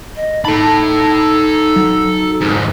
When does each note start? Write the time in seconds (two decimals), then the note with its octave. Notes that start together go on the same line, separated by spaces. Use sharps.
0.16 D#5
0.45 D#4 A4 A5 B5
1.76 F#3
2.41 F2 G#2